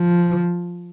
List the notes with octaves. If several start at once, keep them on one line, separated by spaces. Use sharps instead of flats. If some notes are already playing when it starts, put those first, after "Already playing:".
Already playing: F3